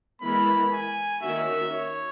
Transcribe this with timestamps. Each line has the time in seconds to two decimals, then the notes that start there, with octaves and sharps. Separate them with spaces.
0.22 E3 G#3 B3 E4 A#4 B5
0.72 G#5
1.23 D#3 A#3 C#4 F#4 A#4 E5
1.73 C#5